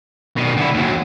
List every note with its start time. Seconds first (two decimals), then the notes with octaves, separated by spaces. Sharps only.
0.36 B2 D#3
0.56 D3 E4
0.74 D#2 F#3